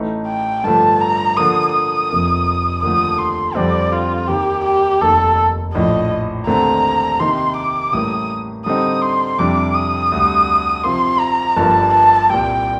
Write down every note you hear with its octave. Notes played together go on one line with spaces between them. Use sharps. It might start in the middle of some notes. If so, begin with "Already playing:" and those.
Already playing: A1 A2 A3 D#4
G5
G2 D3 F3 A3 A5
A#5
D3 F3 A#3 D#6
D#6
F1 F2 C3 F3 A#3
D#2 D3 F3 A3 D#6
C6
F2 D3 G3 C4 D5
F4
D#2 D#3 A#3 G4
G4
F1 D#2 D#3 A#3 A4
A#1 A2 F3 D#5
D#2 D3 A3 C4 A#5
C3 D#3 A#3 D#4 G4 C6
D6
A1 A2 G3 A#3 D#6
D3 G3 C4 D#4 D#6
C6
F2 C3 G3 D4 D6
D#6
D2 C3 G3
C3 F3 C4 F4 A#4 C6
A#5
G1 G2 F3 A#3 A5
A5
C2 A#2 G3 G5